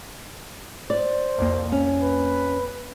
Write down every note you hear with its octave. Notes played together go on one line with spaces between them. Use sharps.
C5 D5
C2 F2 A#3
C#4
B4